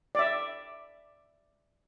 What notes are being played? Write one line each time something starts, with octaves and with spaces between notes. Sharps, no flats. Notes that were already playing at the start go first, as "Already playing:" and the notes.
D5 E5